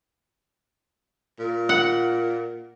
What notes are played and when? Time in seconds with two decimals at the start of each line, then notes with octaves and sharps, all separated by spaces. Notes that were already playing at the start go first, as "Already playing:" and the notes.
1.39 A#2
1.69 F#5